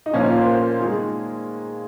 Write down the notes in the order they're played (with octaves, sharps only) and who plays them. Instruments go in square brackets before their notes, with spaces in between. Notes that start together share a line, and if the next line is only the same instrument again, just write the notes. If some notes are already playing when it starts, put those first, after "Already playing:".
[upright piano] D#4
A#2 F3 A#3 C#4
C5
A#4
D#3 G#3 G#4